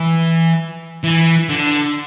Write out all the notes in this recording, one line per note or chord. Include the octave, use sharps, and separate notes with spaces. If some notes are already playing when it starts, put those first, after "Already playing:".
Already playing: E3
E3
D3